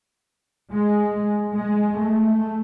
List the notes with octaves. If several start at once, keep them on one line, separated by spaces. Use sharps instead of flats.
G#3
G#3
A3